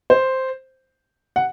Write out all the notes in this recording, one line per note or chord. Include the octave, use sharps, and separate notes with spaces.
C5
F#5